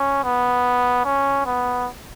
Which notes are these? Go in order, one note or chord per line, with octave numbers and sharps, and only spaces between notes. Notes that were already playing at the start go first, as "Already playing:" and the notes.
Already playing: C#4
B3
C#4
B3